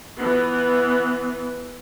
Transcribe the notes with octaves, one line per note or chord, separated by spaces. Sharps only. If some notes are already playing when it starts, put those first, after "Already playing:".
E3 B3